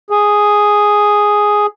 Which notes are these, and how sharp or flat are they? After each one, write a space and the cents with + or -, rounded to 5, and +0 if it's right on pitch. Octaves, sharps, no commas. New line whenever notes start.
G#4 +0